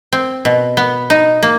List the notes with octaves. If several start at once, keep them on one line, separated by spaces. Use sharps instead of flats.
C4
B2
B3
D#4
A#3